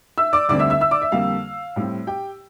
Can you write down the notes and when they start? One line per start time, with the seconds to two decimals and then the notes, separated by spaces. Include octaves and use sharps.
0.18 E5 E6
0.33 D5 D6
0.49 D2 D3 G3 C4 D5 D6
0.59 E5 E6
0.70 E5 E6
0.81 E5 E6
0.91 D5 D6
1.02 E5
1.12 F2 D3 G3 A#3 F5
1.76 A2 G3 C4
2.07 G4 G5